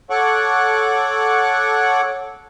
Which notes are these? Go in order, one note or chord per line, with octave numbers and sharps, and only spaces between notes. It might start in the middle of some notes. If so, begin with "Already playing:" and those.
A4 C#5 F#5 C#6 D6 F#6